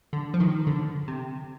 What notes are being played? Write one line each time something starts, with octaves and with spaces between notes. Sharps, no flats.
D3
F3
D#3
D3
C3